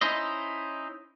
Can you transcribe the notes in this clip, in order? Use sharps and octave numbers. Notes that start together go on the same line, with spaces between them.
C#4 D#4 E4 C5 D#5